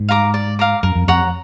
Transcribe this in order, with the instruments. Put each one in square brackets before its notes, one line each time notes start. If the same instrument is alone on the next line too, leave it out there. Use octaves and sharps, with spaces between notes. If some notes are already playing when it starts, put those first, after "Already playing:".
Already playing: [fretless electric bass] G#2
[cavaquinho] F5 A#5 D6
D5
F5 A#5 D6
[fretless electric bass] F#2 [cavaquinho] A#4
[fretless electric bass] F2
[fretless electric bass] F2 [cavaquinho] C#5 F#5 A#5